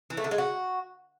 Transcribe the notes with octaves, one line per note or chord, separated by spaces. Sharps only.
E3
A3
D3
G#3
F#4